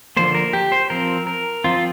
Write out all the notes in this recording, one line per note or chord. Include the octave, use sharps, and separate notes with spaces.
D3 F3 A#3 C5
A#4
G4
C5
F3 C4 A#4
A#4
F3 C4 F4